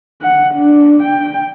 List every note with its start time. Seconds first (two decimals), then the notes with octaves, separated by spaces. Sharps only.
0.22 F#5
0.54 D4
1.03 G5